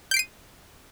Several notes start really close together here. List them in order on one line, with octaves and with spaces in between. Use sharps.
G6 D7 C7 D#7